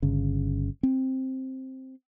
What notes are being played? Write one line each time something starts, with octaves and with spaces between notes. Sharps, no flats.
G1 C#3
C4